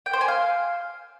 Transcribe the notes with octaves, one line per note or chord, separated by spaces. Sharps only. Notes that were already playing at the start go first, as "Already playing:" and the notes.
G5
C5
G#5
F5